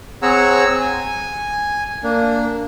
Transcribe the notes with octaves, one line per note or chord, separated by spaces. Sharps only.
C4 G#4 C#5 F#5 A#5 E6
G#5
A#3 D4